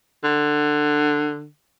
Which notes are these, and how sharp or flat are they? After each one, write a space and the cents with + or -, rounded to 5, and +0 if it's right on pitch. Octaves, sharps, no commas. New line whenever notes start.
D3 +15